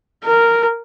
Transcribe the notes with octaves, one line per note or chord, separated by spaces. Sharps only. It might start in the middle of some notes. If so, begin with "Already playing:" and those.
A#4